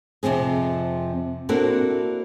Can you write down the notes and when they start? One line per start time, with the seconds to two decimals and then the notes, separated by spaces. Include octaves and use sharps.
0.23 F2 C3 F3 C4 G#4
1.49 A#3 C4 D4 E4 F#4 A4